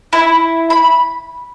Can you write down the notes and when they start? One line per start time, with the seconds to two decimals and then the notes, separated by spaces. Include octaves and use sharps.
0.13 E4
0.70 B5